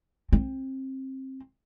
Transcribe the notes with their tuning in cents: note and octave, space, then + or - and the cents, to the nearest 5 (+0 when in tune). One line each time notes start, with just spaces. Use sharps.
C4 +25